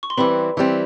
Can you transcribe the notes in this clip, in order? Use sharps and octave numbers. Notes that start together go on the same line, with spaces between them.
C#6
C6
E3 G3 C4 B4 B5
E3 G3 C4